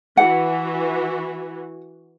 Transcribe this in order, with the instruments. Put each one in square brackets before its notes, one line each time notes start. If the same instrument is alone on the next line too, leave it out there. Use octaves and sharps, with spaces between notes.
[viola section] E3 F#4 [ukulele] F#5